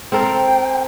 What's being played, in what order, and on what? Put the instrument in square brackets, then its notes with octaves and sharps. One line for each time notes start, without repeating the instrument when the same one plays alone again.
[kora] C4 A4 A#4 [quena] G5